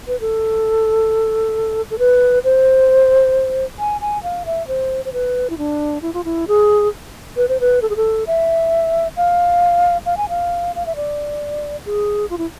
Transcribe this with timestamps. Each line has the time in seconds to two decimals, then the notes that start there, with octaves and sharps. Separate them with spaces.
0.08 B4
0.21 A4
1.91 A4
1.99 B4
2.44 C5
3.79 G#5
4.01 G#5
4.23 F5
4.46 E5
4.68 C5
5.05 C5
5.13 B4
5.50 E4
5.58 D4
6.02 E4
6.14 F4
6.25 E4
6.48 G#4
7.37 B4
7.49 C5
7.60 B4
7.82 A4
7.90 G#4
7.96 A4
8.27 E5
9.17 F5
10.06 F5
10.17 G#5
10.29 F5
10.76 F5
10.86 E5
10.96 D5
11.86 G#4
12.30 F4
12.38 E4